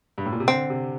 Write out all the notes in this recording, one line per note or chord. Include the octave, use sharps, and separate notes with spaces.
G2
A2
A#2
C3
D3 C4
C3